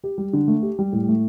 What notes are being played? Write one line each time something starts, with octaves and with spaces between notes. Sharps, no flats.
G4
G3
D3
A3
G4
G3
A2
A3